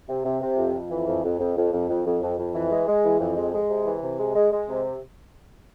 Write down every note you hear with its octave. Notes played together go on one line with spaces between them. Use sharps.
C3
C3
C3
F2
F2
E3
F2
F2
F2
F2
F2
F2
F2
F2
F2
E3
G#3
G#3
E3
F2
G#3
G#3
C3
E3
C3
G#3
G#3
G#3
C3